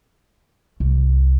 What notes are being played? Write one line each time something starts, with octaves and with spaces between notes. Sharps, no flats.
C2